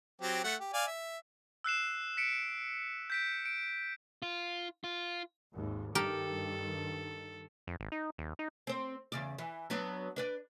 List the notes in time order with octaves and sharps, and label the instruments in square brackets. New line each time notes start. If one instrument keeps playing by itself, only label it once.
[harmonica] F#3 C4 G4
A3 F#5
G4
D5 F5 G#5
E5
[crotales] E6 F#6 C7 E7
B6 C#7 D7
G6 B6 D7
D7
[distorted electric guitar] F4
F4
[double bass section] G#1 D#2
[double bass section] G2 D#3 [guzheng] G4 A#4 [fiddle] A4
[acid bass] F2
G#1
D#4
D#2
D#4
[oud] C4 C5
E2 C#3 D5
E3
F#3 B3 D4
D4 B4 D5